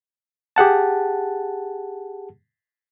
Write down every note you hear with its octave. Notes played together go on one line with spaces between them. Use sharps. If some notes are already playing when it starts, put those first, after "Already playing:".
G4 G#4 F#5 A5